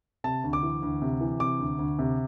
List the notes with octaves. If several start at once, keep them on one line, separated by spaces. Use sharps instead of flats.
C3 A5
D2
D6
E3
D2
C3
E3
C3 D6
D2
D2
C3